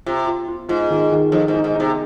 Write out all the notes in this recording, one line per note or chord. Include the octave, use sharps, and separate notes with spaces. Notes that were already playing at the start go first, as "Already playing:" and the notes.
C3 F4
F4
F4
G#2 F4
D#3
D#3
F2 D#4
G#2
D#4
G#2
C3 D#4